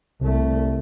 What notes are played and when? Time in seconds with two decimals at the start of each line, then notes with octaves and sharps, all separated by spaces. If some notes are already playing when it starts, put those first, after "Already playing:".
0.21 C2 C3 A3